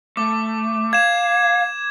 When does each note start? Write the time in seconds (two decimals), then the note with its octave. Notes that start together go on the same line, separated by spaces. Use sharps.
0.17 A3 D6
0.93 F5 G#6 E7